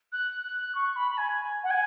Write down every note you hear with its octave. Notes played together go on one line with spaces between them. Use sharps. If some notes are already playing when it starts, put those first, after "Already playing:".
F#6
F#6
C#6
B5
B5
G#5
F#5
G#5